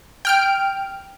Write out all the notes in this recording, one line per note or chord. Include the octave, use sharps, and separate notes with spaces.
G5 F6 D7